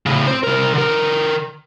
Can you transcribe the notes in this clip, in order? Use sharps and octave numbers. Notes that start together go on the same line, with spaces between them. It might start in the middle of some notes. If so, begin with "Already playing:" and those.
A2 C#3
C4 C5
C2 A#4
D3 A#4